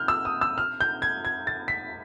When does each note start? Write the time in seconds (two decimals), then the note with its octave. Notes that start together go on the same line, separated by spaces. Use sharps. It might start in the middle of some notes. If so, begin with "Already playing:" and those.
Already playing: F6 G6
0.08 E6
0.25 D#6
0.41 E6
0.58 F6
0.81 G6
1.02 G#6
1.25 G#6
1.47 A6
1.68 B6